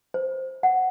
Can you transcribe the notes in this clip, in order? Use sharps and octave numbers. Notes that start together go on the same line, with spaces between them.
C5
F#5